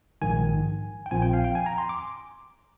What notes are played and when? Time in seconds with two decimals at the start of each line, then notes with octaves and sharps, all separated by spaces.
0.22 A#1 G#2 D#3 G#5
1.06 G5
1.11 A#1 A#2 F3 C4 G#5
1.22 G5
1.33 F5
1.45 G5
1.55 G#5
1.66 A#5
1.78 C6
1.89 D6